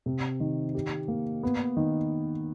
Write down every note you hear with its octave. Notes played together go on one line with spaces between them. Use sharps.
C3
D#3
G4
A#3
B3
D#3